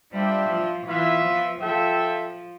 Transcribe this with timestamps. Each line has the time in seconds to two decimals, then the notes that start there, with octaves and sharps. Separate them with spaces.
0.12 G3 D4 F4 C5 E5 G5
0.49 F3
0.87 E3 B3 F4 B4 E5
1.23 F3
1.61 F3 F4 A4 E5 G5